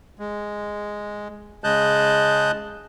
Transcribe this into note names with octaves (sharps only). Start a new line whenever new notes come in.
G#3
C#3 G#3 D#5 A5 F#6 G6